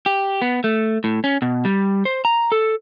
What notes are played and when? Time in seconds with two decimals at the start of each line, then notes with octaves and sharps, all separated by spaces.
0.06 G4
0.42 B3
0.64 A3
1.04 A2
1.24 C#4
1.42 B2
1.65 G3
2.05 C5
2.25 A#5
2.52 A4